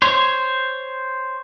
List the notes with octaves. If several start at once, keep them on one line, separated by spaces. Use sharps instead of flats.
C5 C#5